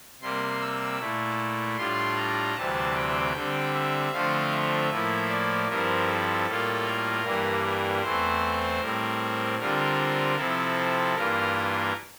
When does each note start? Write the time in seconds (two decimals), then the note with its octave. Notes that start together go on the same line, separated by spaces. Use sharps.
0.21 C3 G3 A#3 C6
0.60 E6
0.99 A#2 A3 E4
1.77 A2 G3 D4 F4 C6
2.17 A#5
2.55 D2 C3 E3 G3 C4 A5
2.95 G5
3.34 D3 G3 C4
3.73 E5
4.12 D3 F3 A3 C4 F4 F5
4.51 E5
4.90 A2 F3 A#3 E4
5.28 D5
5.68 G2 F3 C4 E4 A#4
6.07 A4
6.46 A2 G3 A#3 F4
6.85 A#4
7.24 G2 E3 G3 A#3
7.63 A#4
8.01 E2 E3 A3 C4 C5
8.80 A2 G3 C4 A#4
9.58 D3 G3 C4 F4 A#4
10.36 C3 F3 C4 E4 A4
11.14 G2 E3 A#3 F4 A#4